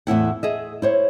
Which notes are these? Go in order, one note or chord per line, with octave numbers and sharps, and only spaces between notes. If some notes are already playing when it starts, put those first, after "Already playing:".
E2 A2 E4 F#5
G#4 D#5 E5
E4 C5 C#5